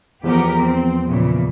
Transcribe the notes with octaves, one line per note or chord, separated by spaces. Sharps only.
E2 F3 B3 G4 A#4
C4
A#2 C#3 E3